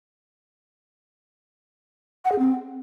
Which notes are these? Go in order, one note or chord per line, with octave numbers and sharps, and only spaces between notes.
F#5
G#4
C4